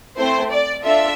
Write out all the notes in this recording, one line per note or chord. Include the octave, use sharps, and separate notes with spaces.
A3 C4 E4 C5
D5
D4 F4 A4 E5